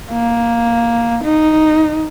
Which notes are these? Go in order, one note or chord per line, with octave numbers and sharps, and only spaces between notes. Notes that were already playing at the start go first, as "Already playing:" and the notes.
A#3
D#4